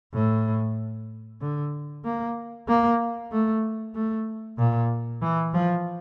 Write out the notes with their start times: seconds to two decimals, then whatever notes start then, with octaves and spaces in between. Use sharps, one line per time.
0.14 A2
1.41 D3
2.05 A#3
2.68 A#3
3.32 A3
3.95 A3
4.58 A#2
5.22 E3
5.54 F3